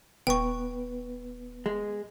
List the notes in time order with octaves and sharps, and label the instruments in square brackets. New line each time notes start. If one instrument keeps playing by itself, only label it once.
[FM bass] D#1 [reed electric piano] B3 B4 [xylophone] G5 C#6
[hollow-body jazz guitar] G#3